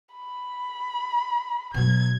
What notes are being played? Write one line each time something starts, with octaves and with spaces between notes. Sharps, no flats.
B5
B2 F#3 G#6